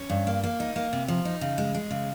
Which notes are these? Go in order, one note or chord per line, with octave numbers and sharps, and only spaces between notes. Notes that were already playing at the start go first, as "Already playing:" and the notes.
Already playing: C#4
G2
A#3
A#3
D#4
A#3
C3
F3
D#4
C#3
G#3
G#3
C#3